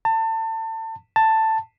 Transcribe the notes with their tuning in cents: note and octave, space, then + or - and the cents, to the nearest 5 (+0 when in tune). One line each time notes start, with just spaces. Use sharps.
A5 +30
A5 +10